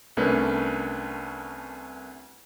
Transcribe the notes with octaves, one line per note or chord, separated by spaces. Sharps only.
C2 A3 C#4 D4 A#4 B4